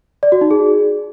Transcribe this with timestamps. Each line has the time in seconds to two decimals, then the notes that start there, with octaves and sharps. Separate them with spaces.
0.23 D5
0.32 F#4
0.41 D#4
0.51 G#4